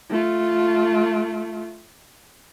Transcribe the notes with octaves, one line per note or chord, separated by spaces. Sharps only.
A3 F4